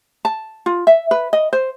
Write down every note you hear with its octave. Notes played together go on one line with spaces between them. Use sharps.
A5
F4
E5
B4
D#5
C5